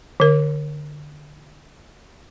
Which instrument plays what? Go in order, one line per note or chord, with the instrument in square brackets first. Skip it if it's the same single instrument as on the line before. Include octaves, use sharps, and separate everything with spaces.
[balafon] D3 A#4